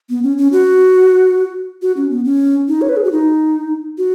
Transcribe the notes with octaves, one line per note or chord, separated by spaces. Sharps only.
B3
C#4
C#4
F#4
F#4
C#4
B3
C#4
D#4
C#5
B4
G#4
F#4
D#4
F#4